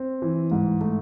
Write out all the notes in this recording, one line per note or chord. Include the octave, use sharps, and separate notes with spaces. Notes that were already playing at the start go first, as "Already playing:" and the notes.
Already playing: C4
E3
G#2
A3